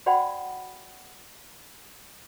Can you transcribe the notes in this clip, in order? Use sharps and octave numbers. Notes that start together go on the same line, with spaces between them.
F#4 C5 D5 F#5 G5 B5